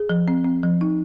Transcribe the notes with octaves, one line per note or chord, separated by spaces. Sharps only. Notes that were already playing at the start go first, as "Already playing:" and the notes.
Already playing: G#4
F3
C4
C4
F3
D#4